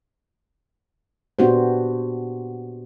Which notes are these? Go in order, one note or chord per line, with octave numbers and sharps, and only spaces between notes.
A#2 B3 D4 F#4 G4 C5